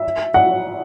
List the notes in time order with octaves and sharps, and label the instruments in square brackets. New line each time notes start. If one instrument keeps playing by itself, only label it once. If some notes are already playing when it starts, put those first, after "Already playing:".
Already playing: [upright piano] E5
F#5